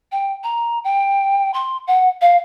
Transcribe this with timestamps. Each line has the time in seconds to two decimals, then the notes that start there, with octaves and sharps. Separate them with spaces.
0.12 G5
0.44 A#5
0.84 G5
1.54 C6
1.88 F#5
2.21 F5